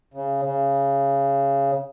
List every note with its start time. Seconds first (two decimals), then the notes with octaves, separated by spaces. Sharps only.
0.14 C#3
0.43 C#3